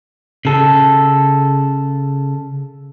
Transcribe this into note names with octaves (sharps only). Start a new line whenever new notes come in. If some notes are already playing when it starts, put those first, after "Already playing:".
C#3 A4